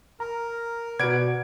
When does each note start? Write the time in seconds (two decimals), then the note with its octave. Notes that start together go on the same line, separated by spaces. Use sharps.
0.20 A#4 A#5
1.00 B2 F#4 B4 D5 F#5 G#6 D7